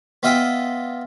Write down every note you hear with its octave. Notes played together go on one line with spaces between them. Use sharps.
B3 F4 D#5 E5 G5